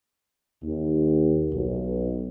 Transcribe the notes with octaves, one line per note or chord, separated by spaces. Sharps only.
D#2
B1